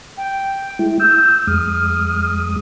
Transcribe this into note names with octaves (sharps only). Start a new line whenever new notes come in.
G5
G#3 E4
E6 G6
F2 G#3 D#6 F6